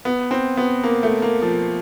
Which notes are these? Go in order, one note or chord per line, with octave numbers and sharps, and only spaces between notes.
B3
C4
B3
A#3
A3
A#3
F3